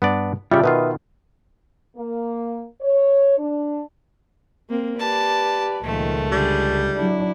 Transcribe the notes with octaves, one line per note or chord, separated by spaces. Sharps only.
G2 B3 D4 D5
C#3 G3 F4 C#5 D5 E5
B2 D#3 F4 B4
A#3
C#5
D4
A#3 C4
G4 B4 D5 A5
C#2 A#2 D#3 F3 A3
D3 G3 G#4
F#3 D4 E4